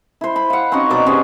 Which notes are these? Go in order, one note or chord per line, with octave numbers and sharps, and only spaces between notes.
E4 C5
B5
F5 F#5
C4 C#4 D#4 F#4
B2 F#3 D5 D6
C4 C#4 G4 G#4